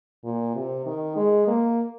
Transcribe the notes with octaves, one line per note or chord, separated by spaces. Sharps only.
A#2
C3
D#3
G#3
A#3